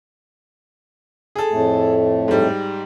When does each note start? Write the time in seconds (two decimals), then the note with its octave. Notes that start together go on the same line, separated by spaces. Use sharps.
1.35 G#4 A4
1.51 F2 A2 A3
2.28 G#2 G3